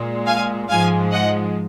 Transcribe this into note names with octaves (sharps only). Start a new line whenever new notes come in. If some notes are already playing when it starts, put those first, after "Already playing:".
Already playing: A#2 G#3
F5 G#5
G#2 F3 G#3 F5 G#5
D#5 F#5